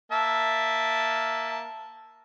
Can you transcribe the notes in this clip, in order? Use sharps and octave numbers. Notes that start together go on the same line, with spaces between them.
A#3 E5 A5